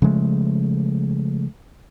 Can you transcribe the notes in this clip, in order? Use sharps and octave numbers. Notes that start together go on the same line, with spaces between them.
C#3 F3 G#3 A3